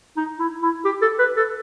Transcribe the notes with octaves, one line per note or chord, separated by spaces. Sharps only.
D#4
E4
E4
G4
A4
B4
A4